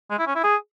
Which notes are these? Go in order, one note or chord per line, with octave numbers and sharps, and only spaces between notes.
G#3
E4
C#4
E4
G#4